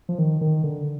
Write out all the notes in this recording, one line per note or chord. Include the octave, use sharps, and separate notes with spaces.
F3
D#3
D#3
D3